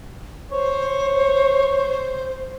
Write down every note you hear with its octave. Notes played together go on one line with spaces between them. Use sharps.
C5 C#5